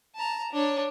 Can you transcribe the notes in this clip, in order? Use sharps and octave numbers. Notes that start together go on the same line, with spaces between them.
A5 A#5
D4 C#5